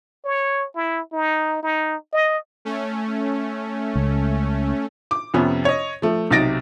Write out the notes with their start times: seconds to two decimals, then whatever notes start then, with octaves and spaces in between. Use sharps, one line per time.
0.25 C#5
0.75 E4
1.13 D#4
1.63 D#4
2.13 D#5
2.65 A3 C#4
3.95 C#2
5.11 D6
5.34 F2 C3 B3 C#4
5.65 C#5 D#5
6.02 F3 A3
6.31 B1 C3 D#4 A6 A#6 D7